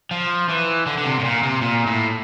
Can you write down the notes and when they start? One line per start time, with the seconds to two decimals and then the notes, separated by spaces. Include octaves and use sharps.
0.11 F3
0.49 E3
0.86 D3
0.98 D3
1.05 C3
1.19 A2
1.24 A#2
1.43 C3
1.62 A#2
1.87 A2